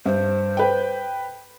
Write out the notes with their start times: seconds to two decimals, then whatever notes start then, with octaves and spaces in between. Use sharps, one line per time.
0.06 G2 C5
0.57 B4 G5